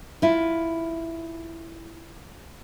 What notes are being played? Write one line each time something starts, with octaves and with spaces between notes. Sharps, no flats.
E4 F4